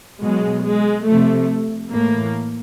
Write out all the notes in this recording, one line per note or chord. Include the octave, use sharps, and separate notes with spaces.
B2 F#3 G#3
G#3
C3 F3 A3
A2 E3 A#3